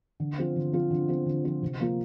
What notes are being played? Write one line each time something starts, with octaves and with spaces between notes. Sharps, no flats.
D3
F3 C4 F4
D3
F3 C4 F4
D3
F3 C4 F4
D3
F3 C4 F4
C3
F3 A#3 F4